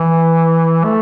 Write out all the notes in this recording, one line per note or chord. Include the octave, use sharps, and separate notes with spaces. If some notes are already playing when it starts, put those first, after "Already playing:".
Already playing: E3
A3